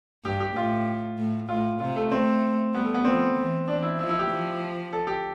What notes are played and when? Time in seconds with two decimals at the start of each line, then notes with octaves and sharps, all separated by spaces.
0.24 G2 G4
0.40 G4
0.56 A2 F4
1.18 A2
1.49 A2 F4
1.80 C3 F4
1.96 A3
2.12 A3 C4
2.74 G3 B3
2.84 A3
2.94 B3
3.05 F3 C4
3.36 E3
3.67 E3 D4
3.82 E4
3.98 F3 E4
4.09 E4
4.19 G4
4.30 F3
4.93 A4
5.07 G4